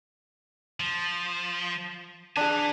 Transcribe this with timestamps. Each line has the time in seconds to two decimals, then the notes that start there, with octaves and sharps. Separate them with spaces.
0.80 F3
2.37 D4 G#4 B4 G#5